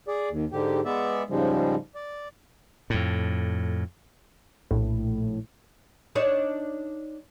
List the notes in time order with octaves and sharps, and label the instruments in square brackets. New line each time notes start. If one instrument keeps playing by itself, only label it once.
[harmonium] G#4 D5
D#2
G#2 D3 G4
G#3 B3 D5 E5
G#2 C#3 F3 G3 G#3
D5
[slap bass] F2 A2
[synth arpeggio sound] A#1 A2
[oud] D4 D#4 C#5